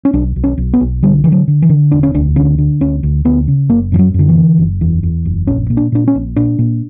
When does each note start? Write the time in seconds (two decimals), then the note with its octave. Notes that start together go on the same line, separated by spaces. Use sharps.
0.05 C#4
0.13 B1 D4
0.36 B1
0.44 C#4
0.58 B1
0.73 B3
0.80 B1
1.03 D3 G3
1.24 D3 E3
1.32 F#3
1.48 D3
1.62 E3
1.69 D3
1.91 E1 D4
2.03 C#4
2.14 D2 D4
2.36 D3 C#4
2.58 D3
2.81 D2 C#4
3.03 D2
3.25 D2 B3
3.48 C#3
3.69 F#1 A#3
3.92 F#2 E3
3.99 F#3
4.14 F#2 D3
4.29 E3
4.36 D3
4.58 F#1
4.81 E2
5.03 E2
5.25 F#1
5.47 A#1 C#4
5.70 A#2
5.77 D4
5.92 A#2 D4
6.08 C#4
6.15 A#1
6.36 A#2 D4
6.59 A#2